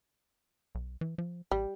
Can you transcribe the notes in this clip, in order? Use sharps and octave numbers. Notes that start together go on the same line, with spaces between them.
B1
E3
F3
A1 G3